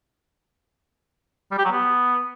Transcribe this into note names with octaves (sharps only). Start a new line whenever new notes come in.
G3
G4
F#3
B3